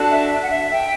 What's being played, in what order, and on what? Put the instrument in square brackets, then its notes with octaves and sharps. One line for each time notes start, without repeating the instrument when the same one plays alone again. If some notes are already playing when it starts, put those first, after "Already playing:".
Already playing: [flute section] D4 F#4 A4
E5
F#5
E5
E5 G5